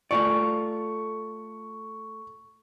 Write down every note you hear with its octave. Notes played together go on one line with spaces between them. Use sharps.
A3 F4 D5 C#6